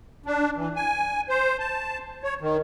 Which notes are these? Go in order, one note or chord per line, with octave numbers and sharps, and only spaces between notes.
D4
E3
G#5
C5
A5
C#5
D#3